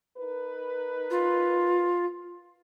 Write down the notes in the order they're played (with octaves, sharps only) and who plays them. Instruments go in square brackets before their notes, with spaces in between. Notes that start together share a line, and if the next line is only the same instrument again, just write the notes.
[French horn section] D#4 A#4 B4
[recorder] F4